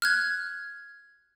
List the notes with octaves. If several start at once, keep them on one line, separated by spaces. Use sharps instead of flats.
F6 F#6 G#6